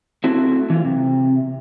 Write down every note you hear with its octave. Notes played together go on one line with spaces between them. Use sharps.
A3 C4 E4 F#4
E3 F4
C3